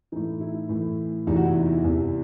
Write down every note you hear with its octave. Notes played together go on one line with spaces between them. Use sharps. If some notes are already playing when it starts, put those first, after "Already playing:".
A2 E3 D#4
E4
A2 E3
E2 C3 E3 D#4
F#4
E4
E4
E2 C3 E3